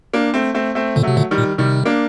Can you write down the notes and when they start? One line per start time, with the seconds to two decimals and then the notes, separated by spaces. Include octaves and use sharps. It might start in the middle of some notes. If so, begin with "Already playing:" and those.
0.14 A#3 D4
0.34 A3 C4
0.54 A3 C4
0.75 A3 C4
0.96 A#2 D3
1.03 C3 F#3 A3
1.17 A#2 D3
1.31 D#3 G3
1.38 A#2
1.58 C3 D#3 G3
1.86 A#3 D4